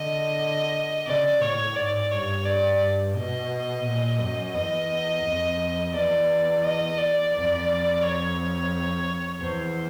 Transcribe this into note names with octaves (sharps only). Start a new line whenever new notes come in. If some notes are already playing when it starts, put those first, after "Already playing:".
Already playing: D3 D#5
C#3 D5
A2 C#5
G#2 D5
G2 C#5
D5
B2 D#5
A#2
F#2
E2 D#5
F2
E2 D5
D#5
D5
F2
C#5
E2 C5